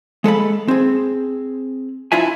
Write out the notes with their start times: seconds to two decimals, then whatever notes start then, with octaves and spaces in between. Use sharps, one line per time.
0.24 G#3 A4 F5 B5
0.68 C4 G#4
2.12 D4 E4 F4 E5 G#5